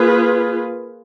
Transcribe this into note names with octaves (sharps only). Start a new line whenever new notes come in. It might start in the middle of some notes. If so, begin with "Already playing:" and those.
Already playing: A#3 F4 G#4 B4